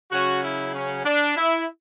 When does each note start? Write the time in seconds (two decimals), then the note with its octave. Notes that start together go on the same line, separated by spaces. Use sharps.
0.11 C#3 F#3 C#4 F#4
0.43 E4
0.75 C#4
1.05 D4
1.37 E4